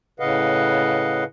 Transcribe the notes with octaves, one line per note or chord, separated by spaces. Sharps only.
A2 C#3 B4 D#5 F5 F#5